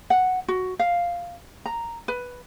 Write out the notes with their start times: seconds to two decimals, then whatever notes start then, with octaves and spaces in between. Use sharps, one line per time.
0.10 F#5
0.48 F#4
0.79 F5
1.66 A#5
2.08 B4